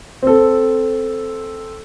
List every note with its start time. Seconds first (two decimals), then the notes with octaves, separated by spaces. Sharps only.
0.23 C4 A4